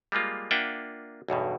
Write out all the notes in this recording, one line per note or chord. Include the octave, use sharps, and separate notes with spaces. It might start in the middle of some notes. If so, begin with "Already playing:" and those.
G3 G#3 A#3 F4
A#3 D4 F4 E5 F#5 G5
B1 E2 G2 B2